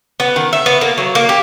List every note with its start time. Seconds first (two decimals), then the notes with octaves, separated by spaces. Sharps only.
0.20 B3
0.36 D#3
0.53 E5
0.66 B3
0.81 A#3
0.98 F#3
1.15 A#3
1.29 G4